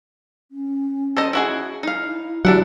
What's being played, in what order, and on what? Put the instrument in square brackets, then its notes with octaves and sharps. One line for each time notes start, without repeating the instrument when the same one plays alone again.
[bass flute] C#4
[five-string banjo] A4 C5 D#5
E4 F#4 G#4
[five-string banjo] D#4 F5 [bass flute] E4
[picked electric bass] F#3 [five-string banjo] D4 E4 F#5 [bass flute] G4